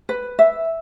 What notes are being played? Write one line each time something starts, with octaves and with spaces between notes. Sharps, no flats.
B4
E5